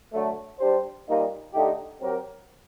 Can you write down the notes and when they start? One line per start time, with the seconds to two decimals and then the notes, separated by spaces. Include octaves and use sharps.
0.13 D3 F#3 A3
0.59 G3 D4 G4 C5
1.07 A#2 G3 A#3 D#4
1.52 D3 A3 D#4 G4
2.00 F#3 C4 G4 A#4